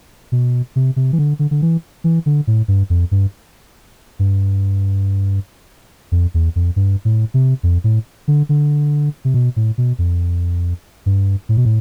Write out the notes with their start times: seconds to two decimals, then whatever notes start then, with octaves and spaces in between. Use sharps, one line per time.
0.32 B2
0.76 C3
0.96 C3
1.12 E3
1.19 D3
1.39 D3
1.51 D3
1.62 E3
2.04 E3
2.26 D3
2.47 A2
2.68 G2
2.90 F2
3.11 G2
4.19 G2
6.12 F2
6.34 E2
6.56 F2
6.76 G2
7.05 A2
7.34 C3
7.63 F2
7.84 A2
8.28 D3
8.49 D3
9.25 C3
9.34 B2
9.56 A2
9.78 B2
9.99 F2
11.06 G2
11.49 A2
11.57 B2
11.65 A2